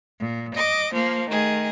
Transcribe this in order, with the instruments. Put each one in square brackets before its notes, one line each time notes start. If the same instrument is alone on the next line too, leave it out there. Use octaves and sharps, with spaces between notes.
[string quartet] A#2
D#5 D6
F3 A#3
D#3 A3 G#4